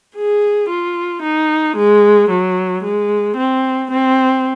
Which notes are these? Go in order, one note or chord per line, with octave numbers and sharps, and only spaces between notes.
G#4
F4
D#4
G#3
F#3
G#3
C4
C4